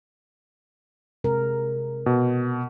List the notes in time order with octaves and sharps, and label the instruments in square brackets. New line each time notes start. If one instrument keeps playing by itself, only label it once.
[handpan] C3 G#3 A#4
[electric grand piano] B2